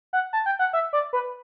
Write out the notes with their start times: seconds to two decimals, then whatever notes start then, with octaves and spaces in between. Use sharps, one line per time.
0.13 F#5
0.33 A5
0.46 G5
0.59 F#5
0.73 E5
0.93 D5
1.13 B4